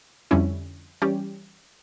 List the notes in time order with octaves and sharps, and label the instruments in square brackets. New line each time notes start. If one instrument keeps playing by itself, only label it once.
[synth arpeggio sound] F2 D3 G3 C#4 E4
E3 G3 C#4 G4